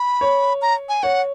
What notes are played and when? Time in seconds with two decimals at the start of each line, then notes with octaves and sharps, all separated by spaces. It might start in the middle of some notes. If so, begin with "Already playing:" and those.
Already playing: B5
0.21 C#5
0.62 A#5
0.89 G#5
1.03 C#5 F#5